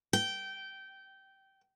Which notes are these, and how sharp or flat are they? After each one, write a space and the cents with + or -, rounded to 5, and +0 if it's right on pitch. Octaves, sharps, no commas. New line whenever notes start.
G5 -15